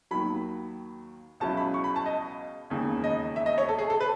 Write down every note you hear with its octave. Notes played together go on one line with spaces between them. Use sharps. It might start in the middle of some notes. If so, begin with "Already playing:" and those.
D#2 D#3 F#3 B5
C#2 B2 F#3 C#4 E4 A5
B5
C#6
B5
A5
D#5
E1 D#2 C#3
D#5
E5
D#5
C#5
A4
G#4
A4
B4